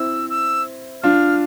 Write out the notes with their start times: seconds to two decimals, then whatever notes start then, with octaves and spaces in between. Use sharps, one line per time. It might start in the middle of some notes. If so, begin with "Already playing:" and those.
Already playing: C4 E4 E6
0.30 E6
1.03 D4 F4 F6